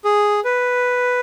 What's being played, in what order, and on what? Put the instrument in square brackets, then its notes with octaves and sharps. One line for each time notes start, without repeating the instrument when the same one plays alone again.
[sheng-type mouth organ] G#4
B4